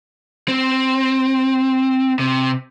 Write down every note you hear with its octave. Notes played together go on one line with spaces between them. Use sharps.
C4
C3